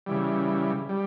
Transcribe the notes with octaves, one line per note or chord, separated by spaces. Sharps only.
C#3 E3 G3
G3